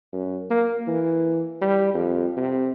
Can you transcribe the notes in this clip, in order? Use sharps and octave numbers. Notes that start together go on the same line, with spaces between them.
F#2
A#3
E3
G3
F2
C3